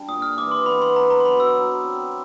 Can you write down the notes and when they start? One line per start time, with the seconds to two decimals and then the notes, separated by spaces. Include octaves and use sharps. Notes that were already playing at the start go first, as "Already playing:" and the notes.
Already playing: G3 D4
0.08 A#2 D#6
0.22 F6
0.37 E3 D6
0.51 C6
0.66 B3 B5
0.82 C6
0.96 B3 A#5
1.10 A#5
1.20 C6
1.25 F#3 B5
1.40 E6
1.55 F#3
1.84 C4